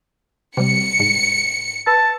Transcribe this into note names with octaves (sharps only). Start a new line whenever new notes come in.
C3 G3 C#7
G#2
B4 A5